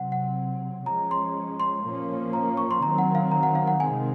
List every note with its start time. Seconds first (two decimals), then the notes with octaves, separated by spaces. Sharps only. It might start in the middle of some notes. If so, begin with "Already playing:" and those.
Already playing: C3 F#3 C4 F#5
0.12 F#5
0.86 F3 G#3 C#4 A#5
1.11 C6
1.60 C6
1.84 A#2 F3 A#3 C#4
2.33 A#5
2.57 C#6
2.71 C6
2.82 D#3 F#3 C4 A#5
2.98 F#5
3.15 F5
3.31 A#5
3.43 F#5
3.55 F5
3.67 F#5
3.80 C3 D#3 G#3 C4 G#5